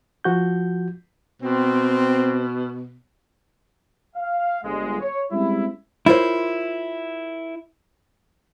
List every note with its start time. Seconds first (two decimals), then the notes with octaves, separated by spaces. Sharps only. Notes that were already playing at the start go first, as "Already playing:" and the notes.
0.24 F3 F#4 G6
1.42 B2 C4
4.16 F5
4.64 G1 G#3
5.01 C#5
5.31 G3 G#3 C4 C#4 E4
6.06 E4 F4 A#4 C5 C#5